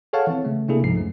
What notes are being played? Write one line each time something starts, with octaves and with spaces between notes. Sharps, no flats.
G#4 A4 C#5 F5 F#5 A5
E3 C4
C#3 A3
C3 A#3 D4 E4 G#4 A4
C#2 G#2 F3 D#4 C7
F#2 A3